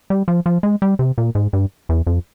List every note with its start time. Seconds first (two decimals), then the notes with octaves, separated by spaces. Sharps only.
0.10 G3
0.28 F3
0.46 F3
0.63 G#3
0.82 G3
0.99 C3
1.18 A#2
1.35 G#2
1.53 G2
1.89 E2
2.07 F2